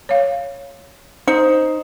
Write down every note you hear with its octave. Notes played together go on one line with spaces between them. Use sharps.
C#5 F5
D#4 C5